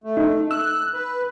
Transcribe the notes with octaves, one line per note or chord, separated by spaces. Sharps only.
A3
D#4
E6 F#6
B4